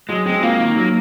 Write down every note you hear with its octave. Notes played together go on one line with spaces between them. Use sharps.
F#3 G#3
G#3 C4
A#3 F4
D#3
F#3